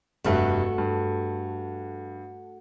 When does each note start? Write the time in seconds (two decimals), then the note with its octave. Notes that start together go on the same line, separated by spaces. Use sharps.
0.24 F1 G2 A3 F#4 A4 E5
0.78 G2